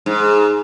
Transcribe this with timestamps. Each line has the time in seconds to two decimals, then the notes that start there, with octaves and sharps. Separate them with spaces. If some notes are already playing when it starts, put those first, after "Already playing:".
0.06 G#2